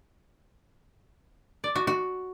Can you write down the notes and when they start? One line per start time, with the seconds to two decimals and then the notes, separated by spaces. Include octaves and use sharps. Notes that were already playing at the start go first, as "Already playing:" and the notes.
1.64 D5
1.75 F#4
1.87 F#4